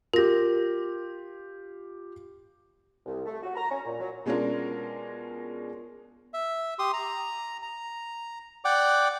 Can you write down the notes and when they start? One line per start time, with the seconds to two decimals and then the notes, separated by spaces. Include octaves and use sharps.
0.13 F4 G4 A#4 A#6
3.06 C2
3.26 A3
3.43 F#4
3.56 A#5
3.70 C#4
3.85 A#2
4.00 F#3
4.26 B2 G#3 C#4 D4 F4 A#4
6.34 E5
6.79 G4 C6 D#6
6.93 A#5
7.63 A#5
8.65 D5 F#5 G5 D6